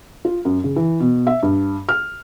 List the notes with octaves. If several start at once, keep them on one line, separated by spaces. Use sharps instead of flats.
F4
F#2
C#3
E3
B2
E5
G2
F6